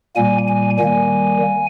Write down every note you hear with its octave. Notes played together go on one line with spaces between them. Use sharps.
A#2 G3 A#3 G#5
G#5
D#3 G3 A#3 G#5